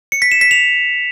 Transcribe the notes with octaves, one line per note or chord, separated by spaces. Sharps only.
C#7
B6
E7
B6
F7